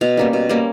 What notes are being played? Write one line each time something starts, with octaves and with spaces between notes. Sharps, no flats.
B2 F5
G3 A#3 C#4
B2
G3 A#3 C#4